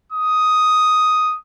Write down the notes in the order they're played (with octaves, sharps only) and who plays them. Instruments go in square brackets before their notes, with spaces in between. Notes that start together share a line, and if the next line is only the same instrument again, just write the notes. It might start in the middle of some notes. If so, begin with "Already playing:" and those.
[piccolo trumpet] D#6